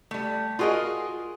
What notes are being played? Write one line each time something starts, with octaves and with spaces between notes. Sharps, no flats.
G3 A3
F4 F#4 G#4 A#4 D#5